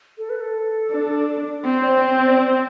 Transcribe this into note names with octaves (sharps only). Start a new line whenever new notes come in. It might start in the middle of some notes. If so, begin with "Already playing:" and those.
A4
B4
A4
D4
C4 C5
D5
C5
C5
D5
C5